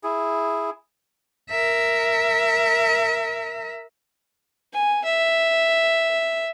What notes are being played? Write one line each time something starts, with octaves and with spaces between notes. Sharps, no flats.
E4 G#4
A#4 E5
G#5
E5